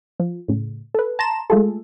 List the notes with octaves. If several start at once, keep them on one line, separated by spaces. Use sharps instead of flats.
F3
A2 C#3
A4 B4
A5 A#5 C6 E7
G#3 A3 F4 G#4 A4